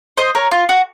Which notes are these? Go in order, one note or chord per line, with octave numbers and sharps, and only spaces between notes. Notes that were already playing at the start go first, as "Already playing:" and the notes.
C5 D#5
A#4 C#5
F4
F#4